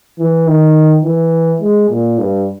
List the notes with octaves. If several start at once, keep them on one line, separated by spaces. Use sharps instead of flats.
E3
D#3
E3
G#3
A#2
G2